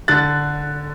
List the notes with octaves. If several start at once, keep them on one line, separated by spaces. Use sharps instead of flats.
D3 F#6 A6